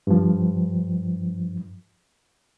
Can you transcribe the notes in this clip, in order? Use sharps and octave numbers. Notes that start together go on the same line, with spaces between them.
G2 F3